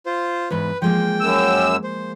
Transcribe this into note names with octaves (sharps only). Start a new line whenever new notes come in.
F4 C5
E2 G#2 B4
F3 G#3 A#3 G5
F#2 E6
C5